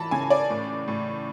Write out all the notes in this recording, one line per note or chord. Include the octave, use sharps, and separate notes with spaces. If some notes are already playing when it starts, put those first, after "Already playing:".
Already playing: E3 A5 B5
C#3 G#5
D5
A2
A2